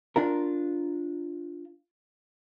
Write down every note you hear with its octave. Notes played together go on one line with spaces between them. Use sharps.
D4 F4 A#4